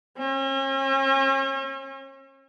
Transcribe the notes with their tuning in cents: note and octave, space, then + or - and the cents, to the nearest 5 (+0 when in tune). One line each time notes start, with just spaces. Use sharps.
C#4 -40